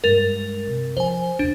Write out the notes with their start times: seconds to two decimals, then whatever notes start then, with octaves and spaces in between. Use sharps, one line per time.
0.04 G2 G#3 A#4 A6 F7
0.67 C3
0.97 F3 C5 G#5
1.39 E2 C#3 D4